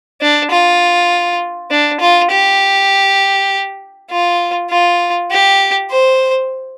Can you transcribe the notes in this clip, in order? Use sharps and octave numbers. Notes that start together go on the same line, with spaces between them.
D4
F4
D4
F4
G4
F4
F4
G4
C5